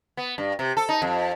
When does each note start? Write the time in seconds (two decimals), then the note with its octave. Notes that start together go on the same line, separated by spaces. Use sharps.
0.17 B3
0.38 G2
0.59 C3
0.77 A4
0.89 D#4
1.02 F2